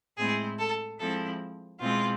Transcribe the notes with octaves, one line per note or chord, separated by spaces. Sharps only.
A2 G#3 C4 E4 G#4
A4
F3 G#3 C4 E4 A4
B2 G#3 C4 E4 F4